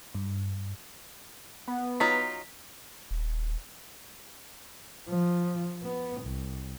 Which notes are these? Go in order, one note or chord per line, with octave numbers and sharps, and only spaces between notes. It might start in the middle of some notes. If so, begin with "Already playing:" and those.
G2
B3
F#3 D#4 F4 B6
D#1
F3
B3
C2